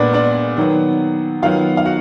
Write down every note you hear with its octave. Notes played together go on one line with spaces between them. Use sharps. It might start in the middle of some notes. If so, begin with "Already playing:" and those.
Already playing: A#2 G#3 B3 D4 B4 D5
D4 D5
D#3 F#3 B3
D#3 F#3 B3 F4 F5
F5
F#4 F#5